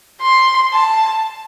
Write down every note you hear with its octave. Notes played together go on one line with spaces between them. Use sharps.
C6
A5